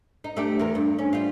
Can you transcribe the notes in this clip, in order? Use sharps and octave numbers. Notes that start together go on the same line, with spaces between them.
D#4
A3 D4 G4
E2 A#4
G2
C#4
G3 F4